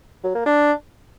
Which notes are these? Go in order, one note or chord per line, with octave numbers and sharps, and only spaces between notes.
F#3
A#3
D4